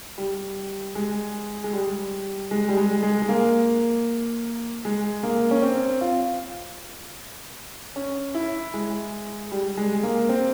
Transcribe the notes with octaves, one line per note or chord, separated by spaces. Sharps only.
G3
G#3
G#3
G3
G#3
G3
G#3
G#3
G#3
A#3
G#3
A#3
C#4
C4
F4
C#4
E4
G#3
G3
G#3
A#3
C4